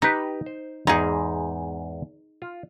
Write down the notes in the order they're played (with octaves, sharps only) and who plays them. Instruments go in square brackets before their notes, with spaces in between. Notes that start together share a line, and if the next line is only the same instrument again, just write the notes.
[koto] D#4 [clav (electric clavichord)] G4 B4
[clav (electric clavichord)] C5
[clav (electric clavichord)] E2 G#2 [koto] D#4 G#4
[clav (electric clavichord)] F4